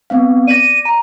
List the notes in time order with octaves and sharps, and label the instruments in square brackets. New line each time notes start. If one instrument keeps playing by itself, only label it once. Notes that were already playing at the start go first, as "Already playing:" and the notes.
[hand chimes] B3 C4 F5
[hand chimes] D5 A#6 [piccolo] D#7
[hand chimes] A#5